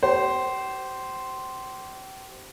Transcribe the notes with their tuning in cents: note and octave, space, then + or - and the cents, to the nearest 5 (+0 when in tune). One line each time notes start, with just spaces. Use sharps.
G4 -40 C5 -5